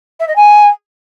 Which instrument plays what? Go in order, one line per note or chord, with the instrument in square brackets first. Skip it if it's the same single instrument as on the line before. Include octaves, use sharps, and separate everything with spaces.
[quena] E5
D#5
G#5